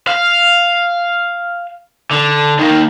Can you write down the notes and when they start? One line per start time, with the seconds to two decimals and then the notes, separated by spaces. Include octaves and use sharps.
0.08 F5
2.11 D3
2.59 D#3 A#3